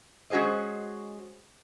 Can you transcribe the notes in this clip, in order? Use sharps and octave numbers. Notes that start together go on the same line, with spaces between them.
G#3 C#4 F#4 G#4 C5 D#5